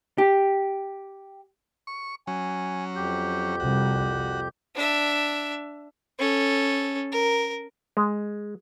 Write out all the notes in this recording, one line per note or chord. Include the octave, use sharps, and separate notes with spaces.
G4
C#6
F#3 C#4 G#5
F2 G4 G6
C2 F#4
D4 E5
C#4 A4
A#4
G#3